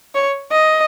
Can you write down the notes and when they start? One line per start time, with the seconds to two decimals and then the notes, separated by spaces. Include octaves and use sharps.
0.15 C#5
0.51 D#5